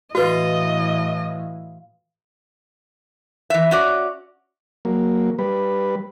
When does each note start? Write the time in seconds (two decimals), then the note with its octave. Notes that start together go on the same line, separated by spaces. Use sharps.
0.15 A2 E3 F4 F#4 B4 D#5
3.50 E3 E5
3.71 C#4 F#4 D5
4.85 F#3 A#3
5.39 G3 B4